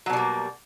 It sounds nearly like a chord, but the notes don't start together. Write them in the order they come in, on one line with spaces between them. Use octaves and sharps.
F#3 B2 G3 A#3